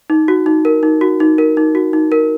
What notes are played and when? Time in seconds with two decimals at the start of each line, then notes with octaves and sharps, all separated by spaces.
0.10 D#4
0.28 F#4
0.46 D#4
0.65 A#4
0.83 D#4
1.01 F#4
1.20 D#4
1.38 A#4
1.57 D#4
1.75 F#4
1.93 D#4
2.12 A#4